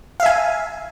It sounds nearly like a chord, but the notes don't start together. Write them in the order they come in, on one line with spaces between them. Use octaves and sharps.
F5 E5 G#5